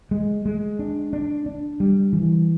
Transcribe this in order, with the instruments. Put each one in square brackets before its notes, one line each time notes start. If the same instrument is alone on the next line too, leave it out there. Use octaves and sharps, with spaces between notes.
[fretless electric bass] G#3
G#3
D4
D4
D4
G3
E3